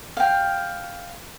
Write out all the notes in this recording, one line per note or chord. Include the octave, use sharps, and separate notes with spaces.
F5 G5